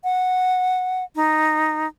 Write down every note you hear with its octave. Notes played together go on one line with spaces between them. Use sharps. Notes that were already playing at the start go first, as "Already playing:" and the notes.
F#5
D#4